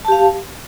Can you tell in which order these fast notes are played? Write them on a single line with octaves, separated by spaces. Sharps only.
A5 G4 F5